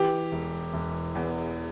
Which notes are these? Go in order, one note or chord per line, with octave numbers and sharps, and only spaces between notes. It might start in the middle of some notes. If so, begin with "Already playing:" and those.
Already playing: E3 G4
E1
E1
E2